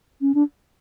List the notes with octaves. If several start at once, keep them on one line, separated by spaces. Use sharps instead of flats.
C#4
D4